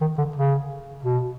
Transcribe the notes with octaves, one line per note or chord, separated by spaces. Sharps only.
D#3
D3
C#3
B2